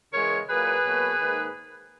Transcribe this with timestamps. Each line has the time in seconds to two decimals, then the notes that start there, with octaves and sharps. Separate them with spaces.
0.12 C#3 E3 G#3 A#4 C#5
0.48 A#2 F#3 A#3 G#4 B4
0.84 B2 F#3 A#3
1.19 G#2 D#3 A#3